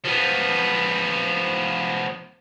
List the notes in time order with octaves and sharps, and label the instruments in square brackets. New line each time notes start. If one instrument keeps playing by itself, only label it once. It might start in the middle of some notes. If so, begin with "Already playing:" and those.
[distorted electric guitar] F3 B3